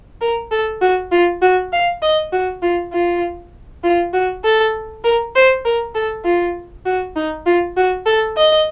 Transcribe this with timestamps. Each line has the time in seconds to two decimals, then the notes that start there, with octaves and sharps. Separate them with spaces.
0.21 A#4
0.51 A4
0.82 F#4
1.11 F4
1.42 F#4
1.72 F5
2.02 D#5
2.32 F#4
2.63 F4
2.93 F4
3.84 F4
4.13 F#4
4.44 A4
5.04 A#4
5.35 C5
5.65 A#4
5.95 A4
6.25 F4
6.86 F#4
7.16 D#4
7.46 F4
7.76 F#4
8.06 A4
8.37 D#5